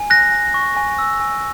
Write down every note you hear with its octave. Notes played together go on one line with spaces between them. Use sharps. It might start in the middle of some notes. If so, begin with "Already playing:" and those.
Already playing: G#5
F#6 A#6
G#5
C#6
G#5
E6
G#5